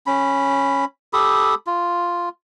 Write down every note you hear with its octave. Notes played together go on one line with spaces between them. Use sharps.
C#4 B5
G4 A4 B5 D#6
F4